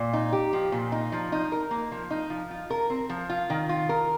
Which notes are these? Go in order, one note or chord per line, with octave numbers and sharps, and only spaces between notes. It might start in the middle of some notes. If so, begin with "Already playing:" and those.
Already playing: A#2
D#4
G4
F3
A#2
D#4
F3
D#4
A#4
A#3
F3
D#4
F3
F4
A#4
C4
F3
F4
D#3
F4
A#4